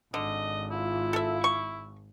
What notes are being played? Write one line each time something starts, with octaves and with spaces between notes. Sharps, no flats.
G#1 D3 D#5
E4 F4
A4 E5
C#6